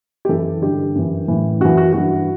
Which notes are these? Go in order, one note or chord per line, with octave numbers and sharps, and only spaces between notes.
G4
F#2 E3 A4
G2 D3 G4
F#2 E3
A2 E3
F#2 E3 F#4
F#4
G2 E3 F#4